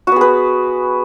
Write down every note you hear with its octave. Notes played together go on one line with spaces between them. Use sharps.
B3 F#4 G#4 B4